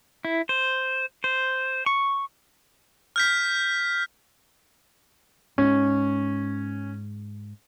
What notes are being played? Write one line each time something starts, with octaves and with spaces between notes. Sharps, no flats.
E4
C5
C5
C#6
F6 G6 B6
G#2 G#3 C#4